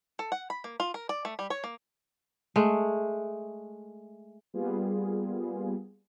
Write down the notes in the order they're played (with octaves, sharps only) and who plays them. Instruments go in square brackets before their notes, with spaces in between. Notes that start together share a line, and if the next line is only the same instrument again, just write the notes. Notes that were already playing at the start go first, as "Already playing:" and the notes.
[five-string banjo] A4
F#5
B5
A#3
F4
A#4
D5
A3
G3
C#5
A#3
[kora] G#3 A3
[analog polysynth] G3 A#3 B3 F4 G#4